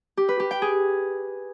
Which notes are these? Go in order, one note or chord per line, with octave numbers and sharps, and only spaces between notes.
G4
B4
G4
G5
G#4